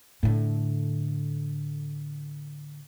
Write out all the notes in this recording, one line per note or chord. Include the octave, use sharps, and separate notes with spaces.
A2 D3